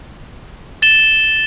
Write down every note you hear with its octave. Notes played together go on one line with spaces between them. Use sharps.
A6 E7 G7